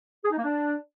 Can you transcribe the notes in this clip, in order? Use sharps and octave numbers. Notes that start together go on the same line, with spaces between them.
G#4
D#4
A#3
D4